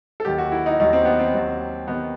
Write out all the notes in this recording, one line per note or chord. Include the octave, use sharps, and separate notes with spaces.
A4
D#2 D#3 F#3 G4
F#4
E4
D#4
D#2 D#3 F#3 D#4
C4
B3
C4
D#2 D#3 F#3
D#2 D#3 F#3 B3